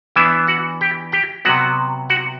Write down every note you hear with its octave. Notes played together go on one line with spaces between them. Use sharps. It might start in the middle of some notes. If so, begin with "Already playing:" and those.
E3 B3 D4 E4 E5
F#4 F#5
G4 G5
G4 G5
C3 F#3 B3 F#4 F#5
F#4 F#5